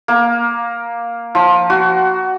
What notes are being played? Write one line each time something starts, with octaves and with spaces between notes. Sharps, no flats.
A#3
F3
F#4